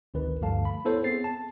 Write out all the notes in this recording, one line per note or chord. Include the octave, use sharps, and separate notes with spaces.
G#1 D2 D#3 C4 B4
D2 G2 D3 F3 F5 A5
B5
B3 E4 A4 C5 C#5
B3 C4 G#4 A6 C7
A5